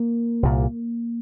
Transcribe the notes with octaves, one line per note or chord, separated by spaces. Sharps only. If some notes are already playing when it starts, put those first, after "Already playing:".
Already playing: A#3
C2 A#2